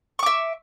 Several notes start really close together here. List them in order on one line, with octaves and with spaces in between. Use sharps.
C#6 D6 E5